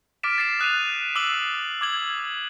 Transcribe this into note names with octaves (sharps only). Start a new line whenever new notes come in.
D6 F6 A6 B6 D7 E7
A6 C7 E7
D#6 F#6 A6 D#7 F7
D6 E6 C7 F#7
D6 G#6 F#7